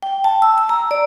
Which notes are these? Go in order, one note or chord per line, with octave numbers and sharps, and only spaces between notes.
G5
A5
E6
E6
A#5
D5